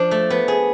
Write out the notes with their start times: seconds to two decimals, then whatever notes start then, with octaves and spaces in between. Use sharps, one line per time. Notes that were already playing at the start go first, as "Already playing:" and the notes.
Already playing: F3 D4
0.11 A3
0.30 B3
0.48 G#4